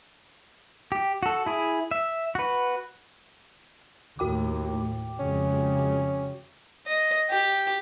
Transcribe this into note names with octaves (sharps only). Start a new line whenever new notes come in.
G4
F#4 A4
E4 G#4
E5
F#4 B4
D#2 A2 F#4 G5 D6
F2 C#3 G#3 C#4
D#5
G4